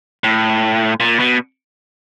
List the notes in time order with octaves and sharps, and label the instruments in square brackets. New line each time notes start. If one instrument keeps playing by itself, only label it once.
[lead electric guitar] A2
A#2
B2